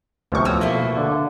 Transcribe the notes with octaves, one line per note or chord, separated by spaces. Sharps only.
D2 A2 C3 F3 B3 C#6
F#3 E6
B2 A3 A#3
D3